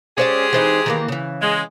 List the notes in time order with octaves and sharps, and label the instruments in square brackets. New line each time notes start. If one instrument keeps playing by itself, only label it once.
[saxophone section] G#3 G4 G#4 [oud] C#4 C5 D5
[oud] E3 C4 D#4
D#3 E3 A#3
C#3 E3
[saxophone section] G#3